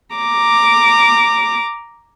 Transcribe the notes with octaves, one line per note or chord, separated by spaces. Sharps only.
A#5 D6